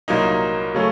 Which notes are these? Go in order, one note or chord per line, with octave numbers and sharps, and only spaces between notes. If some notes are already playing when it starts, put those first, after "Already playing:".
C2 A#2 F#3 A#3 D#4
C#3 F#3 A3 C#4